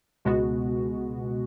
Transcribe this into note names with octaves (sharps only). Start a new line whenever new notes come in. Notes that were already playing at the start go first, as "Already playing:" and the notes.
C#2 B2 G#3 B3 F#4